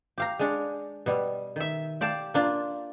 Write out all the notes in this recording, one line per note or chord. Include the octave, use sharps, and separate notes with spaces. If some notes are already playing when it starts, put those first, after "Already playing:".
G4 F5 A#5
G#3 D4 C#5
B2 G3
D#3 E5
G4 D5 F5 A5
A#3 D4 F4